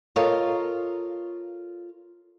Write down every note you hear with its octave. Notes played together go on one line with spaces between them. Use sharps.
F4 A4 A#4 C#5 D#5 F5